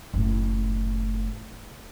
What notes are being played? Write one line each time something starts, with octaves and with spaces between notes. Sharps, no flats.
F#1 A2